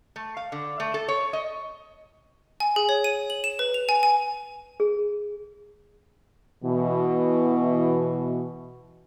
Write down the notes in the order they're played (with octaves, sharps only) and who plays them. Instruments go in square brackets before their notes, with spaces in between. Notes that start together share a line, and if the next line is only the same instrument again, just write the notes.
[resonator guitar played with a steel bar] A3
F5
D3
A3
A4
C#5
D#5
[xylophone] G#5
G#4
C#5
D#7
F#7
E7
B4
F7
G#5
G#5
[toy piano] G#4
[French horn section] B2 E3